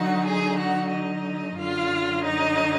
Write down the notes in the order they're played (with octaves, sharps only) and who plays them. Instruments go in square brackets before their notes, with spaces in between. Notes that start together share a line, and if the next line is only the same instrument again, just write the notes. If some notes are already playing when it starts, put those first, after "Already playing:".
Already playing: [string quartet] D3 F#3 D#4 F#4 F#5
G#4 G#5
F#4 F#5
D#4 D#5
F#2 D3 F#3 F4 F5
D#4 D#5